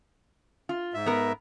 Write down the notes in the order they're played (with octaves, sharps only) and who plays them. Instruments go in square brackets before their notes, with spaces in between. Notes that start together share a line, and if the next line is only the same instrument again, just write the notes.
[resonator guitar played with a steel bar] F4
[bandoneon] G#2 E5
[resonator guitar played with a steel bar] B3 A#4